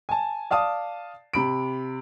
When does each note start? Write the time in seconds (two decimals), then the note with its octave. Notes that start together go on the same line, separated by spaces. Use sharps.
0.09 G#5 A5
0.51 D5 F5 A5 D#6
1.33 C3 B5 D7